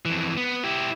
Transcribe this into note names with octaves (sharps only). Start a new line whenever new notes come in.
F2 E3
B3
E4 G4